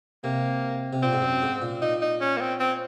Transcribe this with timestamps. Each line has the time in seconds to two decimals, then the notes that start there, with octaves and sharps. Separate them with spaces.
0.24 C3 A#3
0.93 C3
1.02 A#2 C4
1.13 G#2
1.22 F#2
1.42 G#2
1.62 A#2
1.81 A#2 D#4
2.02 D#4
2.21 C#4
2.37 A#3
2.41 C4
2.60 C4